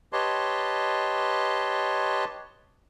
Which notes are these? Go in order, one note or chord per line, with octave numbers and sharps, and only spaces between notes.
G4 B4 C#5 D#5 A5 C6